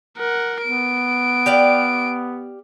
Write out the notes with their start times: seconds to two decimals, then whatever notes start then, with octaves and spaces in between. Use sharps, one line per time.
0.18 A#4 F#5
0.62 B3 D7
1.46 G4 D5 F5